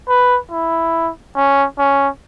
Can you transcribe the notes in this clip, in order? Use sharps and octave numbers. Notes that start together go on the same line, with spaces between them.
B4
E4
C#4
C#4